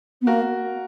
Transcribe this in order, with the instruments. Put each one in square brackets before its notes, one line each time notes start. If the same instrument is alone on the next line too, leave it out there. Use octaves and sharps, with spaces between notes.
[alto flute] B3
[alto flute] A#3 [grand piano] F#4 A#4